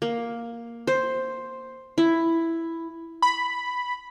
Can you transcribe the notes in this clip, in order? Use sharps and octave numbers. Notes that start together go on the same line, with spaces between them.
A#3
C5
E4
B5